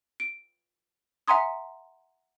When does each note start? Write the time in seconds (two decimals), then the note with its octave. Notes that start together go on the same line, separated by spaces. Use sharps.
0.20 D7
1.28 E5 F#5 G#5 A#5 C6 D#6